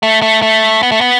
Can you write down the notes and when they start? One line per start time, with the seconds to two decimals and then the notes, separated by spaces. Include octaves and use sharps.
0.03 A3
0.22 A3
0.42 A3
0.83 B3
0.92 A3
1.01 B3